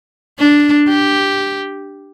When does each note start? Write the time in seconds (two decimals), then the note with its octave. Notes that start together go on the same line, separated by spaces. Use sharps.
0.39 D4
0.88 G4